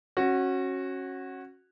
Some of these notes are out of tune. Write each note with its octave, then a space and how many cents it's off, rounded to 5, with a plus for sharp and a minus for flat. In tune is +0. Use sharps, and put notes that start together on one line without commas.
C#4 -25 F#4 +0